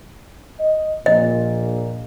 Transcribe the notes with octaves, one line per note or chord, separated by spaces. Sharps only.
D#5
A#1 A#2 D#5